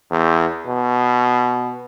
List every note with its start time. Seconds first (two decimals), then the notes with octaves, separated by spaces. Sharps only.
0.11 E2
0.67 B2